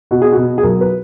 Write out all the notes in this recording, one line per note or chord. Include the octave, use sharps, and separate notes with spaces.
B2 F#4
G#4
B2 F#4
G#4
B1 A#4
B4